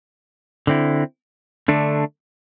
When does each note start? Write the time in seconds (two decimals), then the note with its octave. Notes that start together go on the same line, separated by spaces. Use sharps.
0.67 D3 C4 E4
1.68 D3 A3 D4